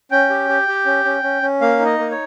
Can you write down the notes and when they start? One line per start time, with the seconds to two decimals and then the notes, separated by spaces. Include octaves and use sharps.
0.11 C#4 G5
0.30 G4
0.49 G4
0.68 G4
0.86 C#4
1.05 C#4
1.23 C#4
1.42 C#4
1.61 A#3 F5
1.79 D#4
1.85 D#5
1.98 A#3
2.11 C#5